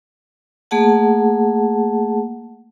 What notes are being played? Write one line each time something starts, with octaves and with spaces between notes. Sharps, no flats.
A3 A#3 G#4 F#5 A5